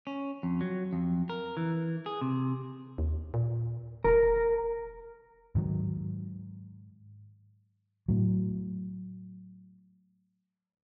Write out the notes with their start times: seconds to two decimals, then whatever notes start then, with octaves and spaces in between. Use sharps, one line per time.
0.07 C#4
0.43 F2
0.61 F#3
0.93 F2
1.30 A#4
1.57 E3
2.06 G#4
2.21 C3
2.98 D#2
3.34 A#2
4.04 E1 A#4
5.55 G#2 D#3 F#3
8.08 A2 F#3